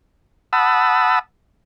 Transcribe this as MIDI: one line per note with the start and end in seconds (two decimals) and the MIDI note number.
0.53 1.19 78
0.53 1.19 81
0.53 1.19 83
0.53 1.19 87
0.53 1.19 88